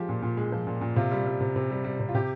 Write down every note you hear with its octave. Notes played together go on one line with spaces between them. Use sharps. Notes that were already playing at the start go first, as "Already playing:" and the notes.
Already playing: F3 G#3 G4
A#2
A#2
G#3
F3
A#2
A#2
C3 F4
G3
G3
C3
C3
G3
G3
C3
F4
C3 G4